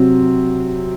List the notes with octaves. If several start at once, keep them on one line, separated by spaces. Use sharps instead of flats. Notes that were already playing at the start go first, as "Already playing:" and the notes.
Already playing: C3 F#3 C4